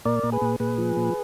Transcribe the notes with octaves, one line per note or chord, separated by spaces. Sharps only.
A#2 A#4 D5
A#2
G#4 B4
A#2
A#2 G#4 B4
F3
A#2